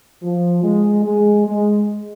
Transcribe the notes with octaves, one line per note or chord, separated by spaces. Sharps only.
F3
G#3
G#3
G#3